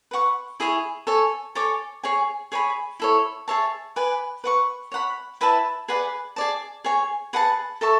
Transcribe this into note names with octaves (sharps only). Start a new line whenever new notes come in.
B4 F#5 C#6
E4 G#4 C#5
A4 C#5 G#5
A4 C#5 G#5 D6
G#4 C#5 G#5
G#4 C#5 G#5 B5
E4 A4 C#5
G#4 C#5 E5 A5
B4 D5 G#5
B4 F#5 C#6
C#5 F#5 B5
E4 B4 E5 A5
G#4 B4 D5 F#5
G#4 D5 A5
G#4 C#5 G#5
G#4 B4 F#5 A5
A4 E5 A5 C#6